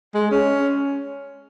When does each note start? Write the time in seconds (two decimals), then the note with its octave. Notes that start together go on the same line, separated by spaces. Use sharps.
0.15 G#3
0.31 C#4